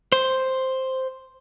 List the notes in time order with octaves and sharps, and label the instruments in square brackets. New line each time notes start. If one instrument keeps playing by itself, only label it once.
[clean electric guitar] C5